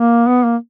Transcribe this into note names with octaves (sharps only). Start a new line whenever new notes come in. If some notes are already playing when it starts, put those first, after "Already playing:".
Already playing: A#3
B3
A#3